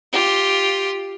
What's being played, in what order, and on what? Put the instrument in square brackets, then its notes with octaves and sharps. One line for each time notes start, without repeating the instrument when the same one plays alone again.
[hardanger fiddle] F4 G4